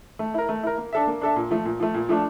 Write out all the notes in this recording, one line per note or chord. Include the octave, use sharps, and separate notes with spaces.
A3
E4 A#4
A3
E4 A#4
A#3
D4 A4 E5
A#3
D4 A4 E5
A#2
F3 A3
A#2
F3 A3
A#2
F3 A3 D4